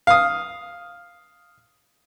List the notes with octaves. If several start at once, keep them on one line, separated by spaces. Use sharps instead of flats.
F5 D#6